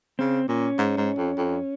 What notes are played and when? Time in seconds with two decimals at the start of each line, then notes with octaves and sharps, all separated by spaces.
0.19 C#3 C4
0.49 A#2 C#4
0.78 G#2
0.97 G#2
1.18 F2
1.37 F2